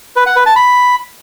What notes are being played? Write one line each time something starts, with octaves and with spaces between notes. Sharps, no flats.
B4
F#5
B4
A5
B5